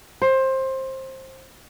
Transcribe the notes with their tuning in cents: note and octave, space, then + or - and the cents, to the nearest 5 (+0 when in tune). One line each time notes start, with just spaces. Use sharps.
C5 +20